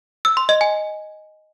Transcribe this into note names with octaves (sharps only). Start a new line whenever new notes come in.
E6
C6
D#5
G#5